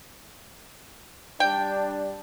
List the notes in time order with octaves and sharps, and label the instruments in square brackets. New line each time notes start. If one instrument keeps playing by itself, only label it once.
[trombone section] G3 D4 [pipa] G5